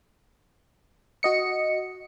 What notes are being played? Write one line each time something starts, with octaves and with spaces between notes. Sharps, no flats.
F#4 D#5 C#7